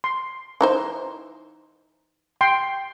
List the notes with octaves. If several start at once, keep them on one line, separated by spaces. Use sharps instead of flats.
C6
E3 D#4 C5
G5 C6